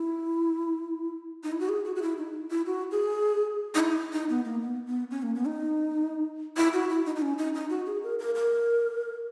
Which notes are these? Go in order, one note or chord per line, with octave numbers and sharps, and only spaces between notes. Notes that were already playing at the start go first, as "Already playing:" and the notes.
Already playing: E4
D#4
E4
F#4
G#4
F#4
F#4
E4
D#4
E4
F#4
G#4
D#4
E4
D#4
B3
A#3
B3
B3
C#4
A#3
B3
D#4
E4
F#4
E4
D#4
D#4
C#4
D#4
D#4
F#4
G#4
A#4
A#4
A#4